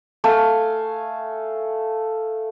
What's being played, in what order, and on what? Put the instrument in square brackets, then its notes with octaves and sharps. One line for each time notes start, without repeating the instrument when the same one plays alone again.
[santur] A3 F5 G#5